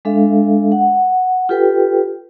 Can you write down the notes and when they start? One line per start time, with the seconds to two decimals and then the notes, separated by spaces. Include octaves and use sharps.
0.05 G#3 D4 A4 E5 F5
0.72 F#5
1.49 F4 G4 A4 B4 G5